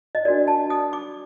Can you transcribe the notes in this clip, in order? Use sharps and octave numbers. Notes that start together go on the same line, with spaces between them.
D#5
D4 F#4 A#4 D5
A5
D#6
D6